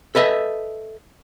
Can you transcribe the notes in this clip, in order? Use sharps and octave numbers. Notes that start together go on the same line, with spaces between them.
A4 B4 D#5 E5